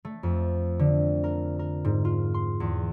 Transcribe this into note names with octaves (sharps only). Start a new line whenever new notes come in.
A3
F2
D3
A#4
A#4
G#2
F4
C6
E2